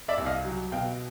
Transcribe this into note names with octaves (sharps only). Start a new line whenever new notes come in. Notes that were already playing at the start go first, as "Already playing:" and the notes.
D5 E5
C2
D#5 F5
F#3
B2 F5 G5